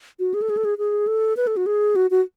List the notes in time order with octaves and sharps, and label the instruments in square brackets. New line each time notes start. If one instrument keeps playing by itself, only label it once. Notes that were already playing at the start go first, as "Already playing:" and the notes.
[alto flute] F#4
G#4
A4
G#4
A4
G#4
G#4
A4
B4
A4
F#4
G#4
F#4
F#4